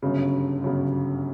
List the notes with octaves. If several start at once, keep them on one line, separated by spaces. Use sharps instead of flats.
G1 F#2 C#3
G1 F#2 C#3